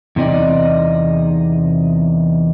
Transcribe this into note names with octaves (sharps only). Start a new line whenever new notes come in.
E2 C3 D#4 D5